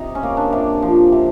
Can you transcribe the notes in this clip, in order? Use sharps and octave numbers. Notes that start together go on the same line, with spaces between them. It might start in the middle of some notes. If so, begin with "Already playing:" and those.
Already playing: C3 D#4
C#4
A#3
D4
C3
F3
C3